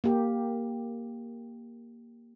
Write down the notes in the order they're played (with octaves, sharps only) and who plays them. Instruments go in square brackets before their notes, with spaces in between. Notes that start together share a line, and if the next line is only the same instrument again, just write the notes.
[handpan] A#3 G4